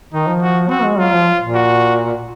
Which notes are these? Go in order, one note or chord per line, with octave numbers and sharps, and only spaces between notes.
D#3 D#4
F3
F#4
C4 F#4
G#3
F#3 F4
F3
A#2
F#4